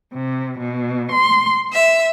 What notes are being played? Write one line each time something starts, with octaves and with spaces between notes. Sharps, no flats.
C3
B2
C6
E5